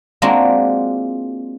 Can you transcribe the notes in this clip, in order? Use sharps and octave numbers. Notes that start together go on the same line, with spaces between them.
G#3 A#3 C4 D4 F4 F#4